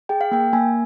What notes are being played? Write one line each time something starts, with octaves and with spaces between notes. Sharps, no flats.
G#4 G5
F5
A#3 G5
A#3 G#5